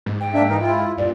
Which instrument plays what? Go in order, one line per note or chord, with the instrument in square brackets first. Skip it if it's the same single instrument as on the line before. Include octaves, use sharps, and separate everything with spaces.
[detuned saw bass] G#2
[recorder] G5
[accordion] A#3 D4 E5
E3 D#4 A#4
E4 F4
[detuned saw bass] G2 [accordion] A#2 [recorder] D5